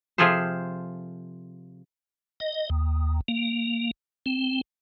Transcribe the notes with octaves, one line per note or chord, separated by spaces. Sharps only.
C3 F3 F4 G#4 A4 C5
D#5
D#2
A#3
C4